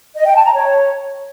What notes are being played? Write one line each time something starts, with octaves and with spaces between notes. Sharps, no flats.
D#5
G5
A5
A#5
C#5